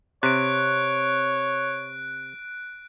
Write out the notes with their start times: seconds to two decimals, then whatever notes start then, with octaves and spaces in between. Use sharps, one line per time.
0.23 C3 C#5 F#6 D7